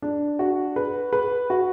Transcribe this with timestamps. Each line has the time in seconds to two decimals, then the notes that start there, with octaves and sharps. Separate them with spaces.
0.02 D4
0.39 F#4
0.76 B4
1.13 B4
1.50 F#4